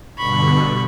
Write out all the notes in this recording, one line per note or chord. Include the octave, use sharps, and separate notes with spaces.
G2 B2 D3 B5 C#6